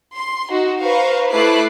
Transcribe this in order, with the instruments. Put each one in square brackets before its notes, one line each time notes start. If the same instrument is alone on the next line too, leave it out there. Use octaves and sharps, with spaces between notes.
[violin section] C6
D#4 F#4
B4 C5 F5 A#5 C#6
A3 E4 B4 D6 F#6 C7